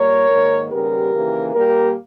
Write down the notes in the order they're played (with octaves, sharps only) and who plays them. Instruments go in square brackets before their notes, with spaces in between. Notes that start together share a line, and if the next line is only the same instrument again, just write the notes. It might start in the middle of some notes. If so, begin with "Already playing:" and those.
Already playing: [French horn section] A#2 G3 A#3 A#4 C#5
G#2 D#3 A#3
D#2 C#3 G3 B3 G4 A#4
D#2 C#3 E3 A#3
A#2 G3 A#3 G4 A#4